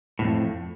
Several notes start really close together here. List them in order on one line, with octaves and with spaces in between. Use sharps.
A2 C3 F2